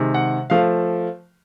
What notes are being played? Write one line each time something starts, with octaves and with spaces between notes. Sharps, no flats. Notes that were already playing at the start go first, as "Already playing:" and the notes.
Already playing: C3 D#3 G#3
F#5
F3 A3 F5